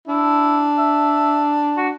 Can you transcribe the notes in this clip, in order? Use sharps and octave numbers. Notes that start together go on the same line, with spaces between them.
D4 E4
E5
F#4